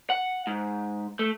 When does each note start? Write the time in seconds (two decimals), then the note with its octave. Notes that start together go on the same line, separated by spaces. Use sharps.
0.10 F#5
0.47 G#2
1.19 A3